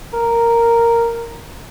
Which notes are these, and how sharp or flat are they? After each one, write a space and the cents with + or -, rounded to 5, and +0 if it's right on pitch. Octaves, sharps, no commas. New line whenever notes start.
A#4 -5